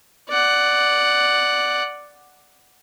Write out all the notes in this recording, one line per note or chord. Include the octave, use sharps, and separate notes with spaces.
D5 F#5